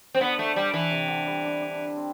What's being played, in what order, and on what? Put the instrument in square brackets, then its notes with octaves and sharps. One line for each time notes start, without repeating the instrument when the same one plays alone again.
[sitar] C4
[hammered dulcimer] D3 [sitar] B3
[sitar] A3
G3
E3
[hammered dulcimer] C3
D3
G3
D4
D4
C4